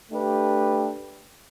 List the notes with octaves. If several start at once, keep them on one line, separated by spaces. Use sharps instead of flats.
A3 D4 G4 B4